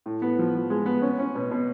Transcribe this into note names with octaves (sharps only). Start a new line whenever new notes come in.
A2
B3
F3
F3
G#3
B3
C#4
C#4
B2
B2